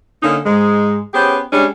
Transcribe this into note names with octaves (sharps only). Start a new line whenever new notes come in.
D3 A#3 C#4 D#4
G#2 G#3
B3 C#4 G4 G#4 C5
G3 G#3 C#4 D4